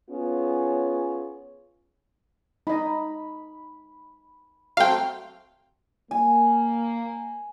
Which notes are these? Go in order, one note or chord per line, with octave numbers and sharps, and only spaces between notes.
B3 C#4 F4 G#4 C#5
D#4 D#5 B5
F#3 A3 C4 F5 G5
A#3 G#5